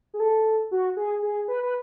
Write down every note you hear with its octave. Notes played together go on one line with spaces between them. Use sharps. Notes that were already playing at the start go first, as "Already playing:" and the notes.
G#4
A4
F#4
G#4
G#4
B4
B4